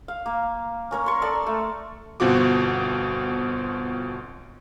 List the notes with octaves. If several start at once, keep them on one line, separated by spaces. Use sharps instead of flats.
F5
A#3
C#4 A#4 C#5
C6 C#6
A4 A#4 D5 A5
A3
G1 B2 C4 F4 F#4 D6